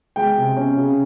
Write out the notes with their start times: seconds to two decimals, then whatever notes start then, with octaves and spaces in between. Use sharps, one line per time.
0.16 G#3 G5
0.37 C3
0.57 C#4
0.77 C#3